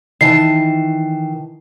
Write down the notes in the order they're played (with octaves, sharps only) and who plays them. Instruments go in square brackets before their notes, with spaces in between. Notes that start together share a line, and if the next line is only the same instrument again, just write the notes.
[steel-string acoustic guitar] D#3 E3 A5 [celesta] C7